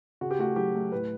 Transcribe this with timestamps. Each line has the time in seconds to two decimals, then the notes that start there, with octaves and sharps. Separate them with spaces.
0.21 C#3 F#4
0.31 G4
0.39 A3 F#4
0.56 F#3 G4
0.74 A3
0.92 A2 B4